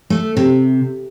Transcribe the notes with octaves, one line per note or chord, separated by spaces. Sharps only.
A3
C3